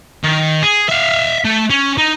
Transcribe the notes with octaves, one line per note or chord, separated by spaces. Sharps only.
D#3
G#4
E5 F5
A3
C#4
D#4